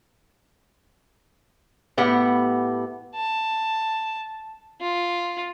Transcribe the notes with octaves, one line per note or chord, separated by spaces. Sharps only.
A2 B3 G4 F#5
A5
F4